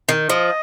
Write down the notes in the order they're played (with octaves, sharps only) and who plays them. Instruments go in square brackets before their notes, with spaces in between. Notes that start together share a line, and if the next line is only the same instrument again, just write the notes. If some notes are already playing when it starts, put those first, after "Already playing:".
[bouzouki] D#3
[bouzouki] F3 [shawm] D#5